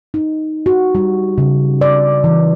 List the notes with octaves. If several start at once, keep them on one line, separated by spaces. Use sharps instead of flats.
D#4
F#4
G3
C#3
D5
E3